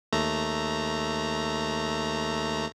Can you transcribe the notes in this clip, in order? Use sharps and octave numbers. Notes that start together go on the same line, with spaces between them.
D#2 A3 A#5